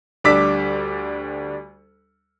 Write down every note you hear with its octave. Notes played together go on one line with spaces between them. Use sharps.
D2 G3 D4 D6 E6 B6